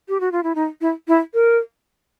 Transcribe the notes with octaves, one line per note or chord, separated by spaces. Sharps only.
G4
F#4
F4
E4
D#4
E4
E4
A#4